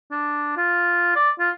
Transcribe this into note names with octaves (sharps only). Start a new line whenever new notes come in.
D4
F4
D5
F4